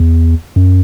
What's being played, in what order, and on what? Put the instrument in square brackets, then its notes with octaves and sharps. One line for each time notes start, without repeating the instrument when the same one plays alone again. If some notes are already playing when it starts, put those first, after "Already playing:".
Already playing: [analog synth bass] E2
F#2